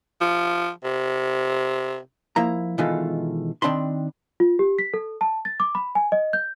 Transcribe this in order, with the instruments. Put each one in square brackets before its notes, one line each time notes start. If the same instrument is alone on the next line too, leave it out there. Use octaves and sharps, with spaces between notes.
[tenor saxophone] F3
C3
[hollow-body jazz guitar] F3 A#3 E4 A#5
B2 D#3 E3 G#3 F4 A4
D#3 C4 D4 A5 B5 C6
[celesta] F4
G4
B6
A4
A5
A6
D6
B5
G#5
D#5
G6